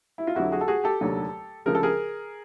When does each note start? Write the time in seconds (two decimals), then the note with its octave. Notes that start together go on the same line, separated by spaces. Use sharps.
0.18 E4
0.27 F4
0.35 F2 D3 F#3 E4 F#4
0.52 F#4 G#4
0.61 A4
0.68 F#4 G#4
0.84 G4 A4
1.01 F1 D#2 D3 F#3
1.66 D2 C#3 F3 G#3 A#4
1.75 A4
1.83 G#4 A#4